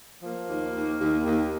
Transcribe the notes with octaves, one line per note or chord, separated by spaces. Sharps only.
F3 A#3
D#2
D#2
D#2
D#2